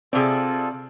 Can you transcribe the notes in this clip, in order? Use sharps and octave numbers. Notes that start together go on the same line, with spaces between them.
C3 C4 F4 G#4 A4 D5